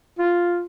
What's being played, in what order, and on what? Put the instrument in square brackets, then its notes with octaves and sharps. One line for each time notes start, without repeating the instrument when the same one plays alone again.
[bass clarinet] F4